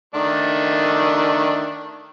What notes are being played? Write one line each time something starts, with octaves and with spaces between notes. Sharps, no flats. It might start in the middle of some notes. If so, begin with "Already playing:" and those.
D#3 A3 D4